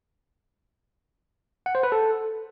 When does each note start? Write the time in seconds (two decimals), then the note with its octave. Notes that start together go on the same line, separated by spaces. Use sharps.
1.66 F#5
1.75 C5
1.83 B4
1.92 A4